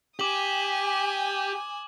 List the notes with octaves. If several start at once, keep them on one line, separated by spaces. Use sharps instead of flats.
G4 G#5 D6 D#6 F#7